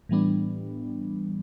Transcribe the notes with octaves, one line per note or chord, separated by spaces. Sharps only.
A2 E3 G3 B3 D4